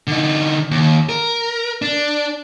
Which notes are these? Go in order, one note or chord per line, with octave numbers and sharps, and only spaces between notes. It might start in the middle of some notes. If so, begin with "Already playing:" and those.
D3 D#4
D#2
A#4
D4